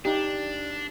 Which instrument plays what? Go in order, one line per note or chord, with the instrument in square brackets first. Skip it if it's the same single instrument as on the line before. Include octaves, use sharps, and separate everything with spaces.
[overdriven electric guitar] D4 [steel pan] D#4 G4